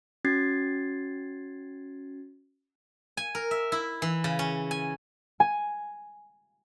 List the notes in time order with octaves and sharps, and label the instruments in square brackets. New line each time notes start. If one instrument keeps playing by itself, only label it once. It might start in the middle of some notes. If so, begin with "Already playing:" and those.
[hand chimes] C#4 F#4 G#6 A6 C7
[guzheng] G#5
A#4
E5
E4
E3
C#3
C#4
G#5
[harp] G#5